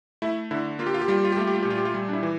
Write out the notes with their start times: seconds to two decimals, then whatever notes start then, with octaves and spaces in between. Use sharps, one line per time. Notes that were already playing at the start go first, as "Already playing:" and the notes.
0.22 A3 E4
0.51 D3 E4
0.79 A#3 F4
0.87 G4
0.94 F4
1.01 G4
1.08 G3 F4
1.17 G4
1.24 F4
1.32 G4
1.37 A3 F4
1.47 G4
1.55 F4
1.63 A#2 G4
1.70 F4
1.78 G4
1.85 F4
1.94 G3
2.09 D4
2.13 E4
2.23 E3